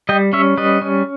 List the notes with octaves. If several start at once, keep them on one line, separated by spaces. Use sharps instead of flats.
G3 D#5 G5
C#4 C#5 E5
G3 B4 D#5
C#4